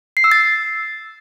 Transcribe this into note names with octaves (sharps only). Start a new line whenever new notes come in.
C7
E6
A6